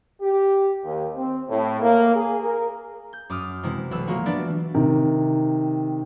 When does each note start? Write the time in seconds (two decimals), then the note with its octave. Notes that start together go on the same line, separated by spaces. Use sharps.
0.21 G4
0.83 D#2
1.15 C4
1.49 A2
1.81 A#3
2.15 G#4
2.44 A#4
3.13 G6
3.30 F#2 D6 D#6 F6
3.63 C3 E3 G#3 E4
3.91 B1 B4 E6
4.07 F#3 G#3 A#3 F4 F#4
4.26 E3 B3 D4 B4 D5 A6
4.74 C3 D#3